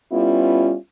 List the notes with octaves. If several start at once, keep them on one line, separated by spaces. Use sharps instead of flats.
G3 B3 C#4 E4 F4